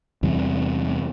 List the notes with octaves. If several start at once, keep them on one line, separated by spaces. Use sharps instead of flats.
E2 C3 G3